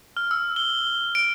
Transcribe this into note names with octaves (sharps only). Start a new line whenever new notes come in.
F6
E6
G7
D7